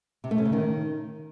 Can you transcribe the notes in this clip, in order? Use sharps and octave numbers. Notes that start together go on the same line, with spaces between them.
C3
A3
C#4
C#3
D#3